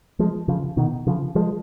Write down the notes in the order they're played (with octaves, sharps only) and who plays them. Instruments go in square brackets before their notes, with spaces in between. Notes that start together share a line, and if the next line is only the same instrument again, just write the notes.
[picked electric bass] F3 G#3
C#3 F3
B2 D#3
C#3 F3
F3 G#3